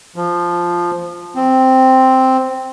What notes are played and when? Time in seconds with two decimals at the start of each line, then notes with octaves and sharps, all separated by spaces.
0.16 F3
1.36 C4